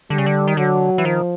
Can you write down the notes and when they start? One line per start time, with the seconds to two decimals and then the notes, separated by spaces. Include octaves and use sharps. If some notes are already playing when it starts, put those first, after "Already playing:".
0.10 D3 G3
0.18 C#3
0.26 D3
0.48 D#3
0.57 D3 F#3
0.98 E3
1.04 D#3 F3